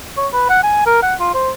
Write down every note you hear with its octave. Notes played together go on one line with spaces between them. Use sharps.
C#5
B4
F#5
G#5
A#4
F#5
F4
C5